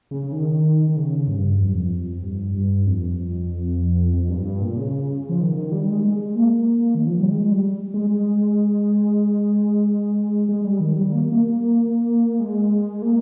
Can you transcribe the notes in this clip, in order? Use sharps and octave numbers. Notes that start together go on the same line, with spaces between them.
C#3
D#3
D#3
C#3
G2
F2
G2
F2
G2
G2
F2
F2
G2
G2
A#2
C#3
F3
D#3
D#3
G3
G#3
G#3
A#3
D#3
F3
G3
G#3
G3
G#3
G#3
G3
D#3
G3
A#3
A#3
G#3
A#3